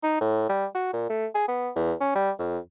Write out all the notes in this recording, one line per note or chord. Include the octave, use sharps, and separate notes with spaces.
D#4
A2
G3
F#4
A#2
A3
G#4
B3
E2
C#4
G3
F2